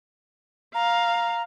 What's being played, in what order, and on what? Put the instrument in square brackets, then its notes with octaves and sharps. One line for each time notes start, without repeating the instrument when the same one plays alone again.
[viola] F5 [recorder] A#5